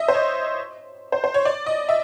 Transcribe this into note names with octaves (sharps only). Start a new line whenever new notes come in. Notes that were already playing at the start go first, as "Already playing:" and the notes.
Already playing: D#5 E5
C5
C#5
C5
C5
C#5
D5
D#5
E5